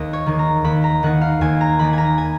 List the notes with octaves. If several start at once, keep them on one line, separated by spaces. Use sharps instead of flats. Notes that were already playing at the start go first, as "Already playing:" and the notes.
Already playing: D#2 D#5
C#5
D#3 A#3 D#4
A#5
D#2 B5
A#5
D#3 A#3 D#4 F#5
F5
D#2 G#5
A#5
D#3 A#3 D#4 B5
G#5 A#5
G#5